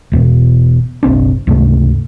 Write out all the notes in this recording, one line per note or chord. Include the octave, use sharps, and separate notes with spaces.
E1 E2 B2
F#1 B1 C4 D4
C#2 G2 C3 A3